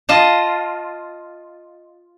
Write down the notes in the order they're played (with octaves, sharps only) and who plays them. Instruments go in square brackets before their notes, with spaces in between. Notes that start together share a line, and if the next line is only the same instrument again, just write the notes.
[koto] F4 D#5 A5